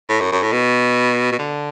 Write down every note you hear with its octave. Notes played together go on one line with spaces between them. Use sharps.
A2
F#2
F#2
A2
B2
B2
D3